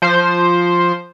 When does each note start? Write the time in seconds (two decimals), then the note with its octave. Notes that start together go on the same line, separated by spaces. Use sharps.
0.02 F3 C5